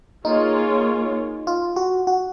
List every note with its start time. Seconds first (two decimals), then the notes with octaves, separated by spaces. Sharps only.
0.25 A#3 D#4 F4 G#4 C#5
1.47 F4
1.76 F#4
2.07 F#4